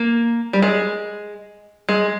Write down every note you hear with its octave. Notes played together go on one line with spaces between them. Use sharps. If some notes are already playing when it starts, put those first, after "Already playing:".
Already playing: A#3
G3
G#3
G#3